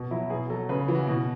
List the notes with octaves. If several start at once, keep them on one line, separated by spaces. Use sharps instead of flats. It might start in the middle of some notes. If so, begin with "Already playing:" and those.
Already playing: B2
F#3 E4
B2 G#4
F#3 A4
C#3 B4
E3
F#4
B2